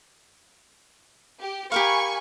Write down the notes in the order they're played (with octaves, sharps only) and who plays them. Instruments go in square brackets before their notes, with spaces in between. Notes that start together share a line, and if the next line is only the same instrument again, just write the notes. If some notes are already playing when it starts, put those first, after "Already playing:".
[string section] G4
[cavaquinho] G4 A#4 F5 [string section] G#5 B5 C#6